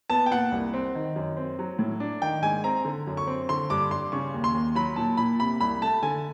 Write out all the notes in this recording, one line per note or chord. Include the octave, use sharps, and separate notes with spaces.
B3 A5
G5
A#2 F#5
C2
C4
D#3
F#2
C4
F#3
A2
D4
D#3 G5
G#2 G#5
C4 A#5
D3
F#2
C#6
C4
D3 C6
G2 D6
G2 C6
C#3 C#6
D#2
C6
D#2
F#3 B5
A#2 A5
A#2 B5
C3 B5
C2 B5
A3 A5
D3 G#5